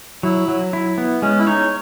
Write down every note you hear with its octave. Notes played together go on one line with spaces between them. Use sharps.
F#3 E4
F#3
E4
B3
G#3 C#4
E4
D#4 C#5